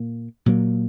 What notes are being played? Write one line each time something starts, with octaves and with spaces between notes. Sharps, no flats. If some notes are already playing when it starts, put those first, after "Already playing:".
Already playing: A#2 A#3
A#2 F#3 A#3